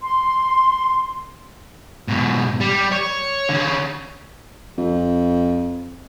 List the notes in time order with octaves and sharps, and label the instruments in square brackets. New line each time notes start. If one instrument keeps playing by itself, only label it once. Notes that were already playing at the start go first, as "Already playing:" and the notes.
[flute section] C6
[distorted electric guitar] G#2 B2
G3
C#5
D3 C#4
[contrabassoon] F2